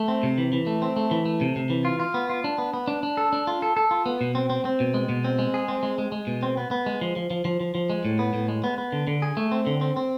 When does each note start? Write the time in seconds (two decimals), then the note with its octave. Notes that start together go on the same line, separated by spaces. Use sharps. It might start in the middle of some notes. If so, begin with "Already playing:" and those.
Already playing: A3
0.08 C4
0.23 C3
0.38 E3
0.53 E3
0.67 A3
0.82 C4
0.96 A3
1.11 E3
1.25 A3
1.41 C3
1.56 C3
1.70 E3
1.85 F4
2.00 F4
2.14 B3
2.29 F4
2.44 D4
2.58 B3
2.74 B3
2.88 D4
3.03 D4
3.17 A4
3.33 D4
3.47 F4
3.62 A4
3.77 A4
3.91 F4
4.06 B3
4.21 B2
4.35 C4
4.50 C4
4.65 C4
4.80 B2
4.94 G#3
5.09 B2
5.24 C4
5.39 G#3
5.54 G#4
5.68 C4
5.83 G#3
5.98 G#3
6.12 G#3
6.27 B2
6.43 C4
6.57 B3
6.71 B3
6.86 G#3
7.01 F3
7.16 F3
7.30 F3
7.45 F3
7.60 F3
7.75 F3
7.90 G#3
8.05 A2
8.19 B3
8.34 A2
8.48 G#3
8.64 B3
8.78 B3
8.92 D3
9.07 D3
9.22 G#4
9.37 A3
9.51 C4
9.67 D3
9.81 C4
9.97 C4